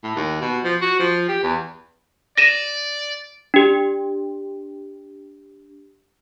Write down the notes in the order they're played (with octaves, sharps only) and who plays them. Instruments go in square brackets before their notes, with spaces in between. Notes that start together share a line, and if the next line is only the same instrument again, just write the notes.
[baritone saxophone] A2
D#2
B2
F3
F#4
F3
G4
E2
[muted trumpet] D5 [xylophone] A#6 D#7 E7
[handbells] D4 G4